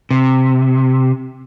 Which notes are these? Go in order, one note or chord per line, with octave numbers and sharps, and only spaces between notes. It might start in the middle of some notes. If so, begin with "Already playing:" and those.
C3